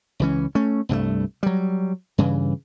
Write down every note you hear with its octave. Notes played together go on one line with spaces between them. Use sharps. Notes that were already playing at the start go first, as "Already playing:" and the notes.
C#2 E3 C#4
A3 C#4
C2 G2 F#3 A3
F#3 G3
G2 C#3 E3